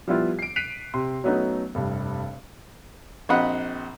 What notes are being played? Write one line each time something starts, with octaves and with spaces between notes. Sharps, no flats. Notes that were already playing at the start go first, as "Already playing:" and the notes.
F3 G3 B3 E4 F4
C7 D7
F#6 B6 C7 D7 D#7 F7
C3 C6
F#3 A3 B3 C#4 D#4
F1 G2
A#1 C4 D#5 F#5 B5